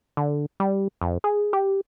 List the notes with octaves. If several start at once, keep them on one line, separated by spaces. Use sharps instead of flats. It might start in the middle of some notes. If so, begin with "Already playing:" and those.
D3
G3
F2
G#4
G4